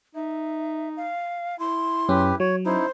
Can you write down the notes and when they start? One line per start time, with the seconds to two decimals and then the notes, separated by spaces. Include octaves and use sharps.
0.15 D#4 E5
0.97 F5
1.60 E4 C6
2.09 F#2 C#4 G4 B4
2.40 F#3 C#5
2.65 C#4 D#4 E4 C5